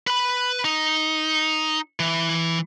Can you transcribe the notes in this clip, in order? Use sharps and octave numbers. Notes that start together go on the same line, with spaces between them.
B4 B5
D#4
E3